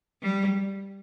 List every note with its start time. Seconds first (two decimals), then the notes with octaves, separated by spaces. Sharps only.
0.22 G3